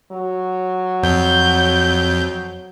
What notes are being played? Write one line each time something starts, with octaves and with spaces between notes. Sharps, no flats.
F#3
F2 G6